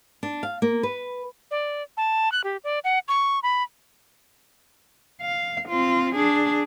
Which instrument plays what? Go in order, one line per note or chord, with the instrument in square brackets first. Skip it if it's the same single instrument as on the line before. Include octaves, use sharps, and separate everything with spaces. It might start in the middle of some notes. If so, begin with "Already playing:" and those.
[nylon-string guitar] D4
F5
A#3
B4
[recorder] D5
A5
F#6
G4
D5
F#5
C#6
B5
[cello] F5
C4 F4
D4 G#4